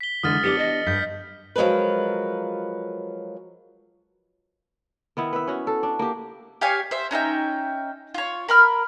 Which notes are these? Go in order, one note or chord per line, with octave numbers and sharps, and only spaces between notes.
B6 G7
D3 E3 G#3 D#6 F6 A6
B3 C#4 D4 G4 C#7 G7
D#5
G2 D#6 G6 B6
F3 F#3 G#3 A#4 B4
D#3 B3 E4
B4 E5
C#4 F#4
A4
D4
A#3 G4
G4 C#5 F5 G#5
C5 E5
C#4 D#4 E5 G5
F4 C#5
A#4 B5 F6